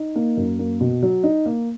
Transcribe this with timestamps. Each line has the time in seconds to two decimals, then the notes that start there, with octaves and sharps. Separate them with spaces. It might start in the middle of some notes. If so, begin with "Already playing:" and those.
Already playing: D#4
0.16 A#3
0.37 F#2
0.59 A#3
0.81 B2
1.02 F#3
1.24 D#4
1.46 A#3